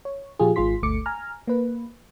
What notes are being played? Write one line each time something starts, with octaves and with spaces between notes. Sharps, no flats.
C#5
A#2 F3 F4 G4 G#4
G#1 G#2 F4 G#4 C6 B6
G1 D2 A3 D6 C#7
G#5 A#5 F6
A#3 B4